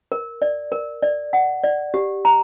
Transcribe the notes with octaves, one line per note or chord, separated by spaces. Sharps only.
A#4
D5
A#4
D5
F#5
D5
G4
A#5